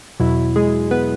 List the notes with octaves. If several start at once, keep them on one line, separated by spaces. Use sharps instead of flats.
E2 B2 F#3 E4
G#3 G#4
B3 B4